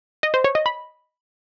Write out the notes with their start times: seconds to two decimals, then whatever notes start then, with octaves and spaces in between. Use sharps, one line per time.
0.23 D#5
0.34 C5
0.44 C#5
0.55 D#5
0.66 B5